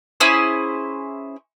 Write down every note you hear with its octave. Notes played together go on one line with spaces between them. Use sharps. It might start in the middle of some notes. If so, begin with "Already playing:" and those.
C#4 E4 G#4 C5